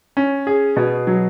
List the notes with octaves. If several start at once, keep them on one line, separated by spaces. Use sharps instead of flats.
C#4
G#4
B2
F#3